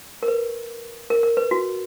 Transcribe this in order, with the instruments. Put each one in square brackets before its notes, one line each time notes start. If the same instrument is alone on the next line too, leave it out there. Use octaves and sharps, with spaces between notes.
[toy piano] A#4
B4
A#4
A#4
B4
F#4